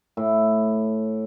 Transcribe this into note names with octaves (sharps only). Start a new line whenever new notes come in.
A2